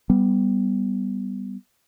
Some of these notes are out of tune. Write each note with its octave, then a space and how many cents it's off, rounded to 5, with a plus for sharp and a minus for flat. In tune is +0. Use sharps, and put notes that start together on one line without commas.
G3 +0 B3 +5